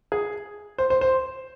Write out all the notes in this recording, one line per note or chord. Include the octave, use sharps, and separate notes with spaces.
G#4
C5
C5
C5